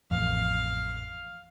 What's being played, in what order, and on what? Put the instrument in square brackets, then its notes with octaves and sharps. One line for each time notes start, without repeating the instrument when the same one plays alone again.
[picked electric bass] A1 F2 [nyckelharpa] F5